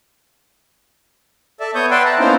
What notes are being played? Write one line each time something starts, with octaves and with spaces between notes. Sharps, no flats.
A4 D5 E5
B3 C#5 C#6 D#6 G6
B4 D5 E5 F#5 G5 C6
A5 A#5
A#3 B3 C#4 D#4 E4 C5